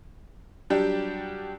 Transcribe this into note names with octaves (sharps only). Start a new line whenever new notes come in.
F#3 G3 D4 G4